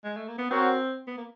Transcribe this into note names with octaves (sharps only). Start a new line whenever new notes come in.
G#3
A3
A#3
B3
C4 F#4 A#4 C#5 F#5
B3
A#3